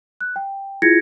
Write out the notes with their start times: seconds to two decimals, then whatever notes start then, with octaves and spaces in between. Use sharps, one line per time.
0.21 F#6
0.36 G5
0.82 E4 F4 G#4 G#6 A#6 C#7